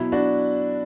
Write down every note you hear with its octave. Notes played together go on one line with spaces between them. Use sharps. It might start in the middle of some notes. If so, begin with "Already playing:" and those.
Already playing: B2 F#3 E4
D4 F#4